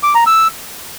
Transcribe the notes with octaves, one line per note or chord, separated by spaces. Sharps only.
D6
A#5
E6